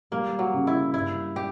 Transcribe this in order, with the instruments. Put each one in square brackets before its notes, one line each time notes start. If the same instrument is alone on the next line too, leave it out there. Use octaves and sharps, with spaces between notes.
[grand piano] G3 [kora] A#3
[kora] F#3
[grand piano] C#3
[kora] E4
[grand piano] G2 [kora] E4
[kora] G4